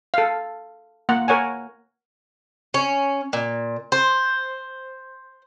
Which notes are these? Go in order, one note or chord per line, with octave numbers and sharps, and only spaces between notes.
A4 F5
A#3 F#5
A#4 C#5 F#5 G#5
C#4
A#2
C5